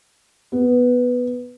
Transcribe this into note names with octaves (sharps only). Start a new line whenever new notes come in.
B3